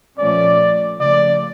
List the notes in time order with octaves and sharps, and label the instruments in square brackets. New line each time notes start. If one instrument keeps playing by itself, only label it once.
[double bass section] A#2 F3 A3 C#4 [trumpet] D5
[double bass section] C#3 F3 A3 [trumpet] D5